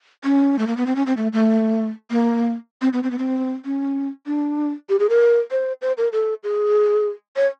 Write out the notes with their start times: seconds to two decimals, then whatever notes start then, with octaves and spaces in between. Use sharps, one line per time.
0.24 C#4
0.59 A3
0.67 A#3
0.77 B3
0.86 C4
0.96 C#4
1.06 C4
1.17 A3
1.33 A3
2.10 A#3
2.82 C4
2.93 B3
3.03 C4
3.11 B3
3.18 C4
3.65 C#4
4.26 D4
4.89 G4
5.00 G#4
5.10 A#4
5.51 C5
5.82 C5
5.98 A#4
6.12 A4
6.44 G#4
7.36 C#5